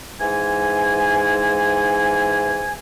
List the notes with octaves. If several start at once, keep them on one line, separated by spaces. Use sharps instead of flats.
G#2 E3 G#5